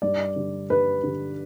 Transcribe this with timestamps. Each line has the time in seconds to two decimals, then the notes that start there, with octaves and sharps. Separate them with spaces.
0.02 G2 D5
0.36 D3 G3
0.70 G2 B4
1.04 D3 G3